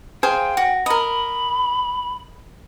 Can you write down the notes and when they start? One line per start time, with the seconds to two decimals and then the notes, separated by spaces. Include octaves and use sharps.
0.23 G#4 C5 F5 G5
0.57 F#4
0.86 A#4 D#5 B5